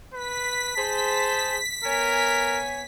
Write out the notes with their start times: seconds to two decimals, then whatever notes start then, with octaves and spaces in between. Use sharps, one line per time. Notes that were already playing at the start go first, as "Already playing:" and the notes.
0.14 B4 B6
0.76 G#4 C5 A5
1.84 B3 A#4 C#5 G#5